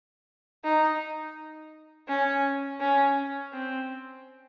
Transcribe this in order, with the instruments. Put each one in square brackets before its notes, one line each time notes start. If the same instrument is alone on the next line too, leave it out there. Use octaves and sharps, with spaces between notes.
[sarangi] D#4
C#4
C#4
C4